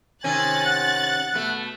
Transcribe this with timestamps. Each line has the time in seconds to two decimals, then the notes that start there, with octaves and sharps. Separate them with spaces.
0.24 C3 D#3 C#4 G#5 F#6 A6
0.65 F#5
1.34 B2 A3